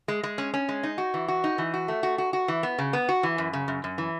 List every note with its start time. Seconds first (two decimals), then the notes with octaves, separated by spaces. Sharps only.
0.08 G#3
0.23 G#3
0.38 C#4
0.54 C#4
0.69 G#3
0.83 D#4
0.98 F#4
1.14 E3
1.28 F#4
1.44 D#4
1.58 E3
1.74 F#4
1.88 A3
2.03 F#4
2.18 F#4
2.33 F#4
2.48 E3
2.63 B3
2.78 C#3
2.93 B3
3.09 F#4
3.23 E3
3.38 F#2
3.53 C#3
3.68 F#2
3.84 F#2
3.98 E3